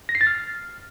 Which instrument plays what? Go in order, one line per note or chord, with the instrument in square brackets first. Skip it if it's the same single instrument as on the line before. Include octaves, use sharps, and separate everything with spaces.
[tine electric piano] A#6
C7
A6
F6